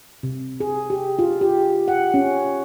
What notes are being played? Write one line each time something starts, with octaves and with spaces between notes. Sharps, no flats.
C3
G#4
G4
F4
G4
F#5
C#4